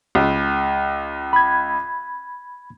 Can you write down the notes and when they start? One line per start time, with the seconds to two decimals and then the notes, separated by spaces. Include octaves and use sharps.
0.15 C#2
1.33 B5 G#6